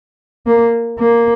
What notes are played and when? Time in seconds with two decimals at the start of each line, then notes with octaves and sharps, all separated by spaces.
0.47 A#3
0.99 A#3